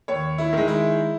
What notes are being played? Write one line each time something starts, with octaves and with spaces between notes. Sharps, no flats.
D#2 C#5
E4
D#3 G#3
E4